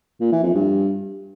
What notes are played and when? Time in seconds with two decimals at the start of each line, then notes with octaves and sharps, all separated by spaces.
0.20 A#2
0.32 E3
0.43 F2
0.55 G2